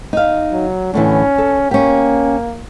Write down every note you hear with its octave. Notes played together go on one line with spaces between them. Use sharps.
D#4 F5
F#3
A2 D3 E3 C#4
A4
A#3 C#4 G4